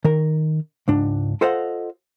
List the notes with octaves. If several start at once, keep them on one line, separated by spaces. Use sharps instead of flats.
D#3 A#4
C#2 G#2 D4
F4 A4 C5 D#5 F5 F#5